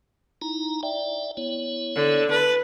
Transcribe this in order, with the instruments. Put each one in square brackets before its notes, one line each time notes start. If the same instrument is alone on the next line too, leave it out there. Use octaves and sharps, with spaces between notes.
[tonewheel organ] D#4 E4 A#5
D5 E5 G5
B3 E4 C#5
[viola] D3
[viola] B4 [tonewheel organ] A5